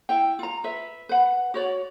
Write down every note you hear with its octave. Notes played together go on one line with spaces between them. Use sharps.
E4 G5
F4 A#5
B4 E5
B4 F#5
F#4 C#5 D5